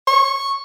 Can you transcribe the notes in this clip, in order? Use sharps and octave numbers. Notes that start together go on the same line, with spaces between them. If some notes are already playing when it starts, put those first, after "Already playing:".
C#6